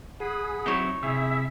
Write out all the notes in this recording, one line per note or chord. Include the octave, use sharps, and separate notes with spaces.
G#4 F#5 B5
F#3 C4 D#4 E4 C#5 C#6
C3 E4 G#4 E5